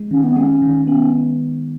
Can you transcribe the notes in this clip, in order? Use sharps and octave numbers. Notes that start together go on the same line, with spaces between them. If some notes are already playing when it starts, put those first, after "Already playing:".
Already playing: G#3
D#3 C#4
B3
G#3 C#4
D#3
B3 C#4